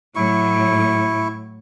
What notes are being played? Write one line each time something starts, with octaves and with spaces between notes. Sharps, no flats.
A2 F#3 E4 C#6